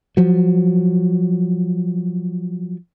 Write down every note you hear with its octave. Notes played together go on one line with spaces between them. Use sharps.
F3 F#3